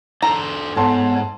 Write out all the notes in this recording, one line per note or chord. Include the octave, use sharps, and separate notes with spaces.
D4 A4 C5 A#5
G#2 B3 A4 C#5 A5 C6